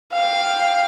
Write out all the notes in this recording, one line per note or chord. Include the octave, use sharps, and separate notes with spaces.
F5 G5